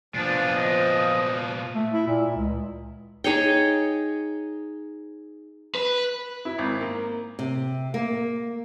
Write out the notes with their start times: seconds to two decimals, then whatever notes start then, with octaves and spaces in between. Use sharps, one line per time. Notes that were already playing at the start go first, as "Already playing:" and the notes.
0.15 A#2 F3 B3 D4
0.56 D#5
1.74 A3
1.93 E4
2.07 A#2
2.36 C#2
3.24 D#4 G#4 C#5 G5
5.75 B4
6.45 E4
6.58 G#1
6.81 A#3
7.39 C3
7.94 A#3